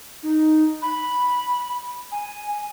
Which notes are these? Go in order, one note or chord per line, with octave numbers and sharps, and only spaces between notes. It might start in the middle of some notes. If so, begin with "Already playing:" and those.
D#4
B5
G#5